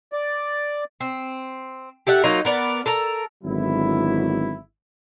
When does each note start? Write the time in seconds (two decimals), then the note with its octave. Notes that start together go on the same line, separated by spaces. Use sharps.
0.12 D5
1.00 C4
2.07 G4 A4 E5 F#5
2.24 F#3 A#3 D#4 F4
2.45 B3 A#4 D5
2.86 A4 A#4 A#5
3.44 G#1 D3 F#3 B3 E4